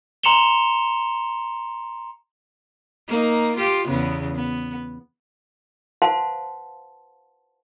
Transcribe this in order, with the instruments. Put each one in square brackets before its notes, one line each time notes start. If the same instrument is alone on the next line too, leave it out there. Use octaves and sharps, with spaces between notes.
[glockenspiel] A#5 C6 C#7 E7 F7 G7
[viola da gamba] A#3 D#4
F4 G4
E2 C#3 B3
B3
[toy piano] B4 C5 F5 F#5 A5 C6